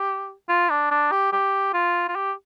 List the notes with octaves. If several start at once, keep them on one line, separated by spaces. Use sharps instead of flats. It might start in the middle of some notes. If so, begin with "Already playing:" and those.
Already playing: G4
F4
D4
D4
G4
G4
F4
F4
G4